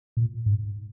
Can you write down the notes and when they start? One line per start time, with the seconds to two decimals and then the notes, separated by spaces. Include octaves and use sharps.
0.17 A#2
0.46 G#2